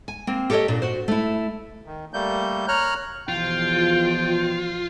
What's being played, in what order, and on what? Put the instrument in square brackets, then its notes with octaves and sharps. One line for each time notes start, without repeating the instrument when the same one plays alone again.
[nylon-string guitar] G#5
A#3 C4
G4 A4 A#4 C5 C#5 D#5
A#2 D4
F#4 C5
A3 E4
[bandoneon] D#3
G3 A3 A#3 G6
C#5 A#5 F6 F#6
[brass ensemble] E2 B2 F3 [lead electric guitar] F4 [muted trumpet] G5